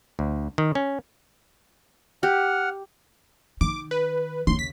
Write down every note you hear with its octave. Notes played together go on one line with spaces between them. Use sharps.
D2
D#3
C#4
G4 F#5 F6
D#3 D6
B4
D#2 C#3 C6
B6